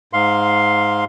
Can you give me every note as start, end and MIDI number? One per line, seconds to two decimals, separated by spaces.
0.13 1.05 44
0.13 1.05 77
0.13 1.05 84